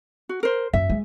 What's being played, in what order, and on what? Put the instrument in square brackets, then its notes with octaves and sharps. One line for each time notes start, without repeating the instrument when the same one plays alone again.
[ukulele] F#4
A#4 C5
[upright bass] F#2 [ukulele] E5
[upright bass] G#3